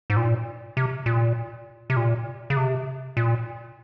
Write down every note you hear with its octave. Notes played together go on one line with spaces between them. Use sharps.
G#2
A#2
C3
A#2
C3
A#2
C#3
C3
A#2